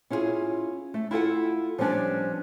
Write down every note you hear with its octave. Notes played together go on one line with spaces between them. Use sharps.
C#4 E4 F4 G4 G#4
A3
E4 F4 A4 F#5
F3 G3 B3 C#4 D4